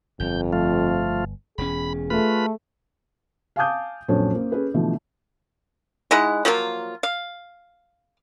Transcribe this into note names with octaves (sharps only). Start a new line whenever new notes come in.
G1 F2 G6
F3 A3 F4
E1 E2 C#4 G#4 B5
A3 F4 B4 B5
F5 G#5 A5 D6 D#6 G6
A#1 F#2 C4 D4 A4 C#5
A#3 C#4 C5
C#4 G#4 A4 B4
B2 D3 E3 F3 A3
G#3 D#4 E4 F#5
F3 F#3 A#3 F4
F5